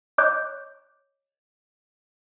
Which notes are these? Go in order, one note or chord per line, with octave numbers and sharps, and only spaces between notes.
C#5 D#5 D6 F#6 G6